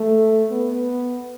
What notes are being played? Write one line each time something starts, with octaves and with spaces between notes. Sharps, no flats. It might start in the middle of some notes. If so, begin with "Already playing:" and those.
Already playing: A3
B3